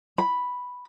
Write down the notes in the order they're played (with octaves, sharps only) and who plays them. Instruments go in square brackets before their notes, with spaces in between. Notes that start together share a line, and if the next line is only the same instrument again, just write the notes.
[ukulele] B5